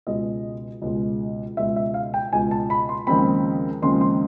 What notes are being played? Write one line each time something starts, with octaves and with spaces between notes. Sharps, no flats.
C#2 B2 G#3 D#5
C#2 B2 G#3
C#2 B2 G#3 E5
E5
F5
G5
C#2 B2 G#3 G#5
A5
B5
C6
D#2 C#3 F3 G#3 C4 B5
D#2 C#3 F3 G#3 C4 C6
C6